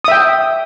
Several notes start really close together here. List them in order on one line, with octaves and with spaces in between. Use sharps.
D#6 E5 G5